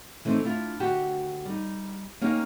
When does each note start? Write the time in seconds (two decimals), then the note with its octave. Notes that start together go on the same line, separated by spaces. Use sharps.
0.25 E3 A3 C4 D#4
0.44 D4 E4 F4
0.80 D2 F#4 G4
1.45 G3 D#4
2.21 A#3 C#4 D#4 G4